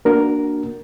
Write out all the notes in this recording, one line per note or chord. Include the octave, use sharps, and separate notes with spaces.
A#3 D4 F#4 A#4